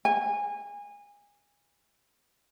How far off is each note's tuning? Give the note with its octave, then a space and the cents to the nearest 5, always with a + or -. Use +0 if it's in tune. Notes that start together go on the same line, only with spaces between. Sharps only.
G#5 -25